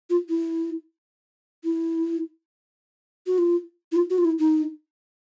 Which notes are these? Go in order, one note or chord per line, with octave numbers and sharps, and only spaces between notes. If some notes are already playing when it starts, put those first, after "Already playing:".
F4
E4
E4
F#4
F4
E4
F4
F#4
F4
E4
D#4